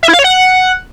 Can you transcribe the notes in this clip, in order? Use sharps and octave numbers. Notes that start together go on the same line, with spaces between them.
E5
E4
F5
C#5
F#5